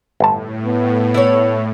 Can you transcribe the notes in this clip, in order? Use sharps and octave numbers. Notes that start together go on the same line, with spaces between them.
G1 A2 A5
B3
E4 A4 C#5